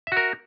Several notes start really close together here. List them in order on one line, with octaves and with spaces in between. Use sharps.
E5 F#4 A#4